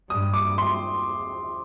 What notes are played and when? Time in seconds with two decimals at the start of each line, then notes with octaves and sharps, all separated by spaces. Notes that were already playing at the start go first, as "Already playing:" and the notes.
0.10 G2 D#6
0.33 D6
0.58 C6